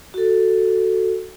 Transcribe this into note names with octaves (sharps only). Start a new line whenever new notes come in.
F#4 A4